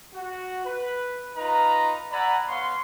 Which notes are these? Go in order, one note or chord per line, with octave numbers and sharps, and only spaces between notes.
F#4
B4
D#4 F4 B4 A#5
D5 E5 F#5 G#5 A#5 B5
B3 C#5 F5 C6